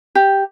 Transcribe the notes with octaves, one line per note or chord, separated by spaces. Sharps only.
G4